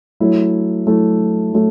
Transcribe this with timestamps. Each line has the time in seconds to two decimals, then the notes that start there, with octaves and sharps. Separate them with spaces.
0.20 F#3 A3 E4
0.87 F#3 A3 E4
1.53 F#3 A3